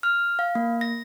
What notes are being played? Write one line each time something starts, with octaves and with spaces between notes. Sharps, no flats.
F6
F5
A#3
A#6